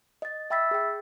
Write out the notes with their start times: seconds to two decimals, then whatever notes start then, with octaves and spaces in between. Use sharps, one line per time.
0.22 D#5 A6
0.50 E5 G5 B5 E6 A6 B6
0.71 G#4 G5